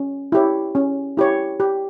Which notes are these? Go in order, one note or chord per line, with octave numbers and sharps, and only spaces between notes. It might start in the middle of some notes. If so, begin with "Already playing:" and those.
Already playing: C#4
E4 G4 C#5
C#4
E4 G4 C#5
G4